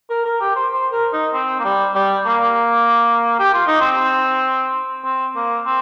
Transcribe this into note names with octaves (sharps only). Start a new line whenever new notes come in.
A#4
A#4
G4
C5
C5
A#4
D#4
C4
A#3
G3
G3
A#3
G4
F4
D#4
C4
C4
A#3
C4